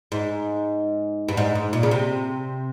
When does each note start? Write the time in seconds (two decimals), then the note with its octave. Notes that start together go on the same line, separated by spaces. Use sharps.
0.12 G#2
1.29 G2
1.37 G#2
1.55 G#2
1.73 A#2
1.83 C#3
1.91 C3